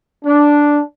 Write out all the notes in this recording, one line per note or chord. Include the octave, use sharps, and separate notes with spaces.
D4